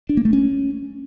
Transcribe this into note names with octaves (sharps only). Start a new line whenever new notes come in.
D4
A#3
A3
C#4